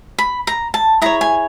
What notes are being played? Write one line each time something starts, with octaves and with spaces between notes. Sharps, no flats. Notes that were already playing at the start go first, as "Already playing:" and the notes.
B5
A#5
A5
E4 G#4 C#5 A#5
G#5